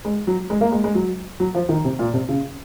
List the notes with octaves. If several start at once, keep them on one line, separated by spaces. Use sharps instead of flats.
G#3
F#3
G#3
A#3
G#3
G#3
F#3
F#3
F3
D#3
C3
A#2
C3
C#3